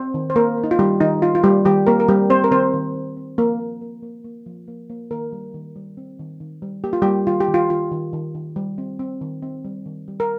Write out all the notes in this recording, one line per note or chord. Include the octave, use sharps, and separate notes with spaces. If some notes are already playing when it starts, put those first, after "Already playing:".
Already playing: C4 C5
D#3
C5
A#3 A#4
A#3
D#4
F4
D#3 G3 G4
D#3 D#4
D#3 F4
F4
G3 A#3 G4
D#3 G3 G4
A#3 C4 A#4
A#4
G3 C4 G4
C4 C5
A#4
D#3 C4 C5
D#3
D#3
C4
F3 A#3 A#4
A#3
A#3
A#3
A#3
F3
A#3
A#3
D#3 A#3 A#4
G3
D#3
G3
C4
D#3
D#3
G3
A#3 G4
F4
G3 A#3 G4
D#3 F4
G4
D#3
F4
D#3 F4
D#3
D#3
D#3
G3
C4
C4
D#3
C4
G3
D#3
G3
A#4